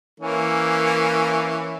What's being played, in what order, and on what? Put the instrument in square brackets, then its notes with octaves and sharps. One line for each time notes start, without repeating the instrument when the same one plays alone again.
[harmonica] E3 A#3 C#4